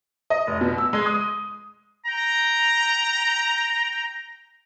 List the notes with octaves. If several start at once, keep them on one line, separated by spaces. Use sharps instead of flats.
D#5
F1
B2
E6
G#3
D#6
G5 A#5